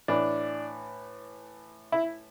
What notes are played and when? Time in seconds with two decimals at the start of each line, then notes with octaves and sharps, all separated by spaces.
0.08 A2 E3 D4
1.92 E4